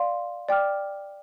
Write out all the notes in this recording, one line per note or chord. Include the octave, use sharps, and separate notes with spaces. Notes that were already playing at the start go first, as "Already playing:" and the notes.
Already playing: D5 F5 C6
D5 G5 D6 F6